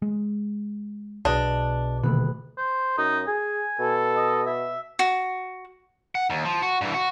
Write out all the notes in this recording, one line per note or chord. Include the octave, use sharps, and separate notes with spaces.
G#3
B1 B2 D4 G#4 D#5
D#1 B2 D3 A3 B5 F#6
C5
F#2 D#4
G#4 G#5
B2 A4
D#5
E5
F#4
F#5
D#2
F3
F#4
G2 E3
F#4